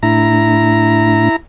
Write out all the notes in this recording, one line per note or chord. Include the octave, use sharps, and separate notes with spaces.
A2 A3 D4 E4 A#5